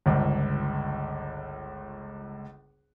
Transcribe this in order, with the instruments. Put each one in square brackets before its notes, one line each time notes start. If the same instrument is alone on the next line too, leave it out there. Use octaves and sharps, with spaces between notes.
[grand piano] G1 C#2